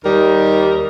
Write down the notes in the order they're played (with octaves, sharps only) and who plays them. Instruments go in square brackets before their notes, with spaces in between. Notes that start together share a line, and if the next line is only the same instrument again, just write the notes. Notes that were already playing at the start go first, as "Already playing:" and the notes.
[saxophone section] D#2 G3 D#4 A#4